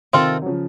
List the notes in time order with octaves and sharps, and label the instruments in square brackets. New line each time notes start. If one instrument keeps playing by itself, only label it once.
[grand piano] C3 D#3 [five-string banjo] C4 F4 A4
[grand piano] F#3
C#3 F3